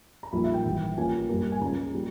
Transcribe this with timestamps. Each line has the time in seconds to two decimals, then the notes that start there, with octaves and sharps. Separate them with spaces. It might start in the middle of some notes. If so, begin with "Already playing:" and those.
0.23 A#5
0.32 A#1 A#2 G3 A#3 D#4 B5
0.43 E5
0.54 G5
0.65 G#1 G#2 E3 G3
0.97 A#1 A#2 A#3 C#4 G#5
1.29 G2 G3 A#3
1.52 G#5
1.61 C#2 C#3 G#3 A#5
1.94 A#2 G3